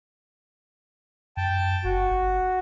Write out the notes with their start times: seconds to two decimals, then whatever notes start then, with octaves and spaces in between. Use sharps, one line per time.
1.37 F#2 G5 A5
1.84 F#1 F#4
2.11 G1